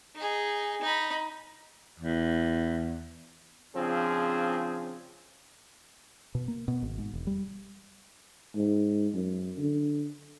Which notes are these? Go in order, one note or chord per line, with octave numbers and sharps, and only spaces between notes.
D#4 G#4
D#4 B5
E2
C#3 F3 C4 D4 G#4
B2
A#3
B2
G#1
G#2
E1
G3
G#2
F#2
D3